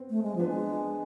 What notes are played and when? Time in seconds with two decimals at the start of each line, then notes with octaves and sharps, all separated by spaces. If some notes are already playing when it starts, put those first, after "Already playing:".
Already playing: B3 C4
0.10 A3
0.23 G#3
0.36 F3 B3 D4
0.48 G#3